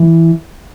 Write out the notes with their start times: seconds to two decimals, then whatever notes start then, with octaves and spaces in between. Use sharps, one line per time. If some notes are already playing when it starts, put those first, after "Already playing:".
Already playing: E3